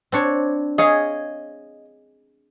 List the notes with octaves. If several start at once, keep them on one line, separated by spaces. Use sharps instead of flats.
C4 D4 C#5
G#4 C#5 D#5 F5